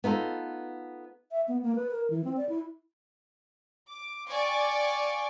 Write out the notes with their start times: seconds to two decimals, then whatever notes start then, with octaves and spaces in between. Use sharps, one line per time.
0.04 B3 D#4 F4 A4
1.31 E5
1.48 B3
1.62 A#3
1.75 B4
1.91 A#4
2.10 E3
2.24 C4
2.37 D5
2.49 E4
3.90 D6
4.29 D5 F5 G5 G#5 C#6 D6